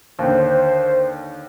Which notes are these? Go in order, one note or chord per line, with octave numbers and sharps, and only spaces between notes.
D#2 D3 C5